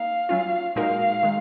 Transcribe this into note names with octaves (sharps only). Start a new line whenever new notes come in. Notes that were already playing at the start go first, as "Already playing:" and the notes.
Already playing: A#3 D#4 F5
F#3 C#4 F4
A#2 G#3 D#4 F#4 A#4 F5
D#3 G#3